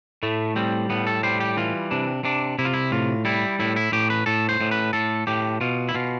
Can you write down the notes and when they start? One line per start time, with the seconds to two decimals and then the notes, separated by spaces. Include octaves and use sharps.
0.23 A2 A3
0.56 G3 C4
0.90 A2 B3
1.07 A4
1.23 G3 C5
1.40 G4
1.57 E3 F4
1.91 C3 D4
2.24 C3 D4
2.59 C3 E4
2.65 F4
2.74 E4
2.92 A2 F4
3.25 G3 E4
3.60 A2 E4
3.76 E4
3.92 A2 G4
4.10 B4
4.26 A2 A4
4.49 C5
4.61 A2
4.71 B4
4.93 A2 A4
5.27 A2 G4
5.61 B2 F4
5.89 E4
5.95 B2 F4